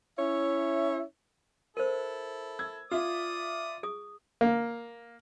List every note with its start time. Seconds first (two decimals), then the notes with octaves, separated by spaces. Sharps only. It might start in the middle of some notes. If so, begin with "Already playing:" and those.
0.18 C#4 E4 C#5 E5
1.77 E4 A4 A#4 C5
2.59 E6 G#6
2.91 F4 D5 E5 D#6
3.83 G#4 D#6
4.41 A#3